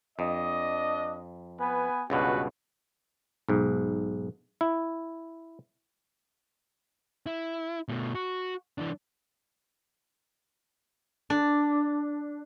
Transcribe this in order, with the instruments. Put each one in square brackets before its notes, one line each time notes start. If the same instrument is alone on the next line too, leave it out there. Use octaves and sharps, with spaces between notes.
[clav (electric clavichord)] F2 [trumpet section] D4 D#5
[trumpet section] B3 B4 G#5
[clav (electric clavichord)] C#2 G2 B2 [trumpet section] C#4 F#4 B4
[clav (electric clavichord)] B1 G#2
E4
[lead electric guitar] E4
B2 A3
F#4
E3 D4
[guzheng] D4